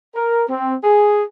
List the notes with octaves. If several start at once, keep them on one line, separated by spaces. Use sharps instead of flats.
A#4
C4
G#4